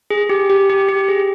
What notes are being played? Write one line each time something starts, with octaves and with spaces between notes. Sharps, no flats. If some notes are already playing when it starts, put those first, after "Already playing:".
G#4
G4
G4
G4
G4
G#4